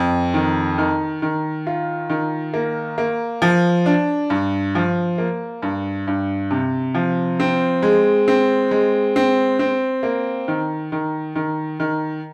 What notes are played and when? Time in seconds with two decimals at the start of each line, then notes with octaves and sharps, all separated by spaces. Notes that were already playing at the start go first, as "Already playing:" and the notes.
Already playing: F2
0.34 D#3
0.78 D#3
1.22 D#3
1.67 F4
2.09 D#3
2.54 A#3
2.98 A#3
3.42 F3
3.86 D4
4.30 G2
4.75 F3
5.18 A#3
5.62 G2
6.07 G2
6.51 C3
6.95 F3
7.40 C4
7.83 G#3
8.28 C4
8.71 G#3
9.16 C4
9.59 C4
10.03 A#3
10.48 D#3
10.92 D#3
11.35 D#3
11.80 D#3